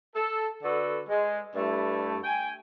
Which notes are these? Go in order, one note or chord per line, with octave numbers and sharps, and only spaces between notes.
A4
D3 F#4 A4 B4
G#3
G2 A3 E4
G5 G#5